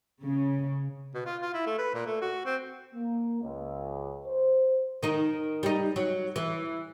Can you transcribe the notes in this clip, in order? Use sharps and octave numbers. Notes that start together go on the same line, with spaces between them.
C#3
B2
F4
F4
E4
A3
B4
A#2
A3
F#4
C4
A#3
C#2
C5
D#3 D#4
G3 D#4
F#3
E3